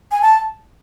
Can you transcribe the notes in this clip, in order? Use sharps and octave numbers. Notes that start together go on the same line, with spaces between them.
G#5
A5